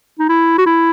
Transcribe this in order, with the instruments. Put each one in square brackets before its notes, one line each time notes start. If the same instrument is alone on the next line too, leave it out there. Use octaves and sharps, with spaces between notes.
[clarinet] D#4
E4
F#4
E4